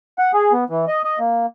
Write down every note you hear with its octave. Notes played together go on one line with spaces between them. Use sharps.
F#5
G#4
B3
E3
D#5
D#5
A#3